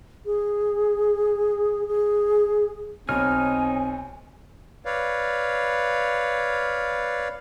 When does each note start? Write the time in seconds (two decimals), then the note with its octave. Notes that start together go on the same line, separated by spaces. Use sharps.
0.25 G#4
1.88 G#4
3.09 B1 C4 D#4 C#5 G#5 F6
4.85 B4 C#5 D5 F5